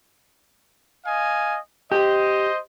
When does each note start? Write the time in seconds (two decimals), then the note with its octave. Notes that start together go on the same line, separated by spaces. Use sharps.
1.06 D#5 F5 G#5
1.92 G4 C5 D#5